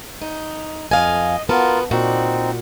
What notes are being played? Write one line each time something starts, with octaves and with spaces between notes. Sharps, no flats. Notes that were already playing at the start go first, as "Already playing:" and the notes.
D#4
F2 D#5 F5 G#5
B3 F4 F#4 A#4 A5
A#2 C4 D#4 F#4